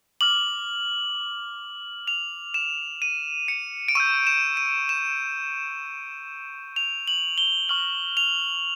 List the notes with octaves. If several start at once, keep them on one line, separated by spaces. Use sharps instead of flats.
D6 F6 F#7
F7
E7
D#7
C#7
D7
C#6 E6 G6 D#7
E7
D#7
E7
F7
F#7
G7
C#6 F6 F#7
F7